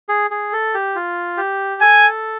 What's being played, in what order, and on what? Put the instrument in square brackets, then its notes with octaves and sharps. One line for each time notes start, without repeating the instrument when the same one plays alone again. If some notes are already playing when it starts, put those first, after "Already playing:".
[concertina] G#4
G#4
A4
G4
F4
G4
[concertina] A4 [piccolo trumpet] G#5